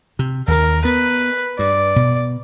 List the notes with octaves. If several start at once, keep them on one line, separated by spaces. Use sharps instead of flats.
C3
D#2 D#3 A#4
B3 B4
G2 D5
B2